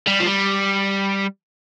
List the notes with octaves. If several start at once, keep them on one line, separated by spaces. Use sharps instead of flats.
G3
F3
G3